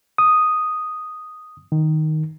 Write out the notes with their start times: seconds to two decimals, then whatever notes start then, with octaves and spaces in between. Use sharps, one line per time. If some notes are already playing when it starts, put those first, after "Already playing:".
0.18 D#6
1.72 D#3